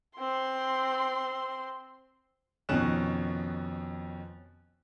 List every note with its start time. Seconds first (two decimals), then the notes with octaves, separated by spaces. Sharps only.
0.18 C4 C6
2.69 F2 B2 D#3 C#4 F#6 E7